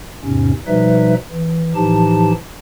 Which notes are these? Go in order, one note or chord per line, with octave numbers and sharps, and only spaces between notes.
E2 G#2 C3 C#4
B2 F3 G3 D#4 B4 E5
E3
A2 E3 F3 D#4 G4 A5